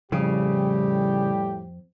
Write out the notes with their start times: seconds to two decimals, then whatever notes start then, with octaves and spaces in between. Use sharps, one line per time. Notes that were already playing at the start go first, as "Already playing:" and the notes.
0.12 F2 A2 C#3 G3 G4